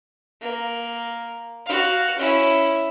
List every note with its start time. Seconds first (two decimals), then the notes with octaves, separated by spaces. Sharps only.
0.42 A#3
1.66 F#4 F5
2.19 C#4 E4